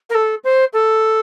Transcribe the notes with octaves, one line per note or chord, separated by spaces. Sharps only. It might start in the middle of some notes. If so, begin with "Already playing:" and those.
A#4
A4
C5
A4